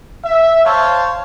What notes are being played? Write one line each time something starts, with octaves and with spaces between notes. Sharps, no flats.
E5
C5 C#5 F5 A5